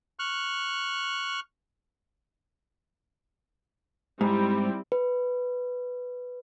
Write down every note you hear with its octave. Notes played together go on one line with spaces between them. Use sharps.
C#6 F6 F#6
G#2 G3 C4 E4
B4